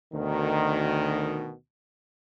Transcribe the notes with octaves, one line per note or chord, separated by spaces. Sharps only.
D2 B2 D#3